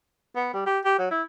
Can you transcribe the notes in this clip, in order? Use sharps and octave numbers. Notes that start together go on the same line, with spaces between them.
B3
G3
G4
G4
F#3
E4